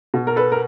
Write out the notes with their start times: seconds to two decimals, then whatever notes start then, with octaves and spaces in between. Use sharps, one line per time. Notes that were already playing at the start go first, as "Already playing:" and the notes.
0.14 B2
0.27 A#4
0.36 A4 B4
0.52 A#4